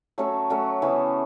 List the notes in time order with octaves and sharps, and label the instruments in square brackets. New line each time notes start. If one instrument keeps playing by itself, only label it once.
[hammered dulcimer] F#3 A3 C#4 A4
F#3 A3 C#4 A4
C#3 E3 B3 A4